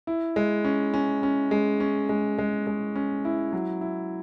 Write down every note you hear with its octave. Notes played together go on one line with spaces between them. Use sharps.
E4
G#3
C#4
C#4
C#4
G#3
C#4
G#3
G#3
G#3
C#4
E4
F#3
E4